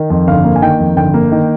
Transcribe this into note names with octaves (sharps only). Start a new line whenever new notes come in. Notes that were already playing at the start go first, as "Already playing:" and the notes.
Already playing: D#3
F2
G1 F5
A#3
G#5
D#3 G5
F2
G1 G5
A#3
D#3